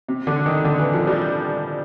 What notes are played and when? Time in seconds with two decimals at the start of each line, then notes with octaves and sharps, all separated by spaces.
0.08 C3
0.27 D3
0.46 D#3
0.64 D3
0.79 E3
0.93 F3
1.07 G3